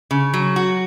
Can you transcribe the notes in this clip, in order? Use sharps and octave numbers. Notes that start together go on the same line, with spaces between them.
C#3
F#3
F#4